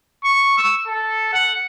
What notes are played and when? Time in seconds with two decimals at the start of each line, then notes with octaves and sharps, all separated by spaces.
0.24 C#6
0.58 E6
0.87 A4
1.33 F#5